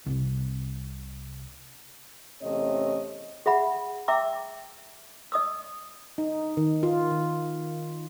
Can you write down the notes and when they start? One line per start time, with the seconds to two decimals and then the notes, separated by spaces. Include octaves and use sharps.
0.06 C2 C3
2.41 E2 C3 A3 C#4 C#5 D#5
3.46 G#4 E5 F#5 B5
4.08 E5 G5 A#5 D6 E6
5.32 D#5 D#6 E6
6.18 D#4
6.57 D#3
6.83 F4
7.11 D#3